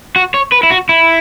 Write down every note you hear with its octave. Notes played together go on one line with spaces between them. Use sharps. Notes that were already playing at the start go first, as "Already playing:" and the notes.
F#4
C#5
B4
E4
F#4
E4